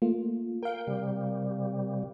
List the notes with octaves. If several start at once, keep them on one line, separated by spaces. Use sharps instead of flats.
A3 A#3 F4
A#4 F5 G5
C3 G3